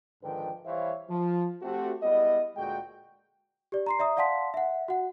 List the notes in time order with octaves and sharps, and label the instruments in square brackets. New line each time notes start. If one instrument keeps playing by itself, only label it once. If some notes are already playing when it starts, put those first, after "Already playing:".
[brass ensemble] G#2 D3 D#3 F3 B4 G5
E3 G3 C5 C#5 E5 F5
F3
A3 C4 F#4 G4
G3 G#3 B3 E4 D#5
D2 A#2 G#3 F#4 G5
[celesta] G4 D5
A#5 C6 C7
D5 E5 A#5 D#6
D5 F5 F#5 A5 C6 B6
E5 F#5
F#4 F#5